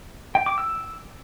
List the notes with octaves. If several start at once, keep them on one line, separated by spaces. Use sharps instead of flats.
G5
D6
E6